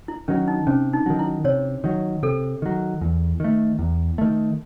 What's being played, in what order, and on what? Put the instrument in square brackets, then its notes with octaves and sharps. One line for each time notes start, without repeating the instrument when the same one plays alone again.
[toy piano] E4
[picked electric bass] D#3 F#3 [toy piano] C#4
[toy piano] D#4
[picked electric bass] C3 [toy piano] C#4
[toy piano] D#4
[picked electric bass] D#3 F#3
[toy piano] E4
[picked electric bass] C3 [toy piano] C#5
[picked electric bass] D#3 F#3
[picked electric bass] C3 [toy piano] A4
[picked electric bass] D#3 F#3
E2
D#3 A3
E2
D#3 A3